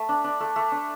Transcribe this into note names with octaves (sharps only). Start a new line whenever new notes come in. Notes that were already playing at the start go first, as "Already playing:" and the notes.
Already playing: A3
D4
D4
A3
A3
D4